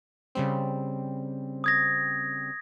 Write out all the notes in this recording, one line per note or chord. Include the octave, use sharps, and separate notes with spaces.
C#3 G3 C4
D#6 G#6 A#6